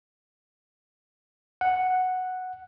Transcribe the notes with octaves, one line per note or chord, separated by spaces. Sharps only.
F#5